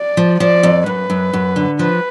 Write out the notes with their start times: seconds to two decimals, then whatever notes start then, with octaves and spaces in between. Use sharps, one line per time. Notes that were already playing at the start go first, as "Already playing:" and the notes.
Already playing: D5
0.17 F3
0.40 F3 D5
0.63 F2
0.86 F#2 B4
1.10 F#2
1.33 F#2
1.56 D3
1.79 F3 B4